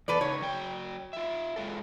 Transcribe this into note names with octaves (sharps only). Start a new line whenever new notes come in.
E2 A4 B4 D5
C#3 D#4 C#5
F#3 G5
F4 E5
G#3 F4 A4